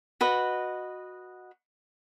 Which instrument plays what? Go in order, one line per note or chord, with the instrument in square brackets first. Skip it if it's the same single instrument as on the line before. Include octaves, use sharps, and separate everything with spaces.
[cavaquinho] F#4 B4 D#5